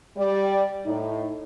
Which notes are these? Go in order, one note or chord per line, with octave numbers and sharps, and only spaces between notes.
G3 D5
A2 D#4